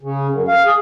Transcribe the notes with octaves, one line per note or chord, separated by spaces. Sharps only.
C#3
F#2
F5
G#4